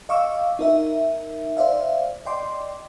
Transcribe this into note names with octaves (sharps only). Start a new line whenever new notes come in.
D#5 F5 C#6 D6 E6
D#4 A#4 E5
C5 D5 E5 F5
D5 D#5 G5 C6 D6